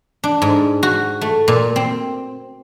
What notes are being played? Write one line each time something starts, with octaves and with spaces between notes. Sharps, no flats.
D4
G#2
F#4
A3
A#2
C4